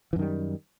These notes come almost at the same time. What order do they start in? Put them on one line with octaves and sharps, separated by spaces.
E3 F#2 D#3 G3